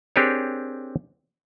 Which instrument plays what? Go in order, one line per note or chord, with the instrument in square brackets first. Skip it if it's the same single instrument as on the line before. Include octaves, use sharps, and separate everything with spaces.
[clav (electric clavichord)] C4 D4 G4 G#4 A#4 C#5